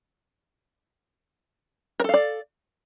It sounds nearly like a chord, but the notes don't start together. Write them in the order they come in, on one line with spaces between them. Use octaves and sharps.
A#4 A4 F5 D5